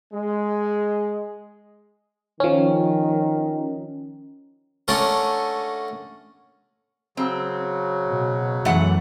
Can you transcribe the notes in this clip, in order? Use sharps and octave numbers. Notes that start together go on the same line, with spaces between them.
G#3
D#3 F3 C#4
D3 A3 C#4 A#4
C#3 F#3 C4
B2
F#2 E3 A3 F#5